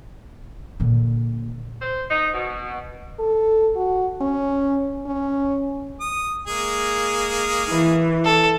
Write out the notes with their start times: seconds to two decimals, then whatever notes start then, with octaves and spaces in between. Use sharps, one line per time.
0.80 A#2 D3
1.82 C5
2.10 D#4
2.34 B2
3.19 A4
3.76 F#4
4.21 C#4
5.06 C#4
6.01 D#6
6.47 G#3 A#3 G#4
7.69 E3
8.25 A4